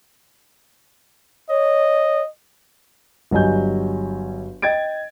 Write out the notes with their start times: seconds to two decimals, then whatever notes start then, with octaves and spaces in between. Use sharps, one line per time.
1.50 C#5 D#5
3.31 G1 F#3 G3 D#5 G#5 G6
4.62 D#5 G5 G#6 A6 D7